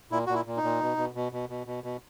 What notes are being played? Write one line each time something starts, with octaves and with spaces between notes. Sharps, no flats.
A#2 E4
A#2 F#4
E4
A#2
D#4
A#2
B2
B2
B2
B2
B2
B2
B2